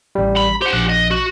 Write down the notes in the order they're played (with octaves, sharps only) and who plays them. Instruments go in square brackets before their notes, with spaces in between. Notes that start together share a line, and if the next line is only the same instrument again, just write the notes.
[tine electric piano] A1 G3
[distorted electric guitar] B5
[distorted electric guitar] G4 F#5 [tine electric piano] C5
[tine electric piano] A#1 F#6
[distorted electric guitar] D#5
F#4